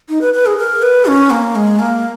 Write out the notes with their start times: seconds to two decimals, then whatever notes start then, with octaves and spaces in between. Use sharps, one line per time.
0.09 D#4
0.21 B4
0.34 B4
0.46 G#4
0.58 A#4
0.82 B4
1.06 C#4
1.31 A#3
1.55 G#3
1.79 A#3